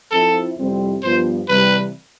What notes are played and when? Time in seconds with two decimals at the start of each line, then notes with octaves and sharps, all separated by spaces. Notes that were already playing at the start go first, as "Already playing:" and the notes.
0.11 F3 C4 E4 A4
0.57 F2 C3 G3 C4 E4
1.03 G2 F3 B3 C5
1.48 C3 E3 G3 B4